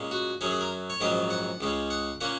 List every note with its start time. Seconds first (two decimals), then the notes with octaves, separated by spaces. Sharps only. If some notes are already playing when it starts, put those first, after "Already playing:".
Already playing: A#2 G#3 C#4
0.11 F#4
0.41 F#2 F#3 C#4 G#4
0.51 G#4
0.61 A#4
0.90 C#5
1.01 A#1 G#2 D#3 F#3 C#4 D#5
1.30 F#5
1.61 C#2 C#3 G#3 C#4
1.90 F#5
2.21 A#2 A#3 C#4 F#5